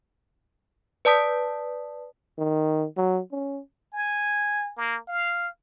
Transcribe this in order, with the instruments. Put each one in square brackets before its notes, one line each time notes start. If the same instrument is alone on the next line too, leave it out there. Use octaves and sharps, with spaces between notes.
[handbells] B4 D5 A5 D#6 B6
[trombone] D#3
F#3
C#4
[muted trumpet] G#5
A#3
F5